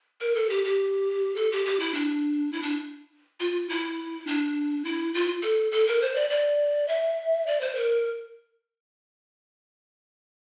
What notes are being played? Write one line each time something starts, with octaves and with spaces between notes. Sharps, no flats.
A#4
A4
G4
G4
A4
G4
G4
E4
D4
E4
D4
F4
E4
D4
E4
F4
A4
A4
A#4
C5
D5
D5
E5
D5
C5
A#4